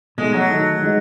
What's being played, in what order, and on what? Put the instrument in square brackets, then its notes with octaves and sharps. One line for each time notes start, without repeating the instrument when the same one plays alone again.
[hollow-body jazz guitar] B2 A3 D#4 [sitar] G#3
[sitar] F#3
[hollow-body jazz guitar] D#3 A3 D#4 A4
E3 G#3 D#4